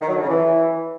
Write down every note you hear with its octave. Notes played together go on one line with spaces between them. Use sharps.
D#3
F#3
D3
C#3
E3